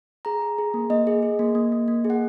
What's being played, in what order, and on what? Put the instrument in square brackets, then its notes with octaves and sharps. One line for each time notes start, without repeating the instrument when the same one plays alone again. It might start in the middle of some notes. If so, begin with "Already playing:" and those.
[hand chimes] G#4 A#5
G#4
G#4
A#3
A#3 D#5
G#4
G#4
A#3
A#3
A#3
A#3
G#4
F#5